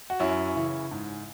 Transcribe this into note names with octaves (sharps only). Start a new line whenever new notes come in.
F#4
F#2 C#4 E4
C#3 E3
G#2